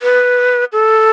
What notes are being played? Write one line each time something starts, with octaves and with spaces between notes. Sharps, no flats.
B4
A4